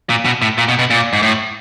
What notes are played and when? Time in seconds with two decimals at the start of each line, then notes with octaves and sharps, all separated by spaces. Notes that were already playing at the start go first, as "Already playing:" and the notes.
0.09 A#2
0.25 B2
0.42 A2
0.58 A#2
0.68 B2
0.79 B2
0.90 A#2
1.13 G#2
1.22 A2